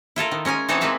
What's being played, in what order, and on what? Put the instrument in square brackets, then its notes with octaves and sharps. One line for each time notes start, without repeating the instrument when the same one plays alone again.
[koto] E4 F4 A4 A#4
D#3
G#3 C#4 A#4 G#5
E3 C4 D#4 C#5 F#5 A5
G#3 A#3 C4 B4 E5 F5